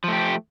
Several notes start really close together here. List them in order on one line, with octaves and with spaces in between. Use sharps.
F3 A3 G4